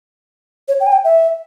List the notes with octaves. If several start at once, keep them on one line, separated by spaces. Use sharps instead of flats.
C#5
G5
G#5
G5
E5